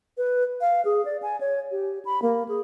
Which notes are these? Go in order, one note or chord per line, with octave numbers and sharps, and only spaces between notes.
B4
F5
G#4
D5
G#5
C#5
G4
B5
A#3
G#4